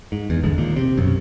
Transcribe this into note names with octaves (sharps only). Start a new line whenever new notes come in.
G#2
E2
G#1 E2 D3 G#3
A#1 D#2 A#2
C3
B1 F#2